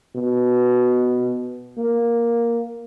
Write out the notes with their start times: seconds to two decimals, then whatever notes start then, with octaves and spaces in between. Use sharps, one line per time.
0.15 B2
1.78 A#3